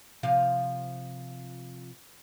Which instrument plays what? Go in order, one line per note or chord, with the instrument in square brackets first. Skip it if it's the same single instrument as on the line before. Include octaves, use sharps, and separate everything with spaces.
[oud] C3 F3 F5